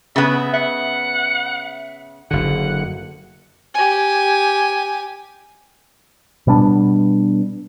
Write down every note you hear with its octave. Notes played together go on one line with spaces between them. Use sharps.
C#3 B3 E5
E5 F#5
F#1 D3 F#5
G4 G#5
B2 G3 B3 D4